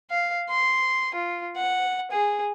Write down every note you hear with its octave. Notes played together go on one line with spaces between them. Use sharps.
F5
C6
F4
F#5
G#4